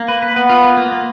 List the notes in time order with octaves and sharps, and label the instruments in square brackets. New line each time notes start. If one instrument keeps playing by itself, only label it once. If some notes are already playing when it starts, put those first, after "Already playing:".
Already playing: [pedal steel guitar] A#3
B4
B4
[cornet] B3 [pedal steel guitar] B4
[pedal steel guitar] F4
A#3
A#3
A#3